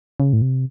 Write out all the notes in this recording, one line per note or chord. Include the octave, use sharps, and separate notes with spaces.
C#3
A2
C3